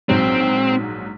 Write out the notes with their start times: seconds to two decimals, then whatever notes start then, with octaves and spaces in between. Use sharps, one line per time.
0.09 A#1 G#2 F#3 C4